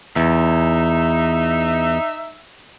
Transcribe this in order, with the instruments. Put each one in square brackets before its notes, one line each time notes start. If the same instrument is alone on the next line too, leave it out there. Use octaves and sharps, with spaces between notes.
[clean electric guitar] E2 [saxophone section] D#4 E5